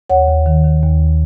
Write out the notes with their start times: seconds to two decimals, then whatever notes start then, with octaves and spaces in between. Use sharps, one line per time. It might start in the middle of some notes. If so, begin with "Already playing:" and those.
0.10 D#2 C#5 F#5
0.28 D#2
0.46 D#3
0.64 D#3
0.83 D#2